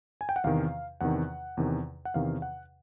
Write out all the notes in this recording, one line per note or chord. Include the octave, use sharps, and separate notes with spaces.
G#5
G5
F#5
E2 C3 D#3 F5
E2 C3 D#3 F#5
E2 C3 D#3
F#5
E2 C3 D#3 F5
F#5